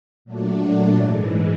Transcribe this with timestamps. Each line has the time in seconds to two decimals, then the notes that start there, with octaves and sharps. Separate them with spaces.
0.25 A#2 F#3 A3 D4
0.95 G#2 E3 G#3